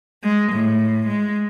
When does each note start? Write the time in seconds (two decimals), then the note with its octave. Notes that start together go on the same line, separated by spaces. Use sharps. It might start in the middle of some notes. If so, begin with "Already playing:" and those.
0.23 G#3
0.52 A2
1.07 G#3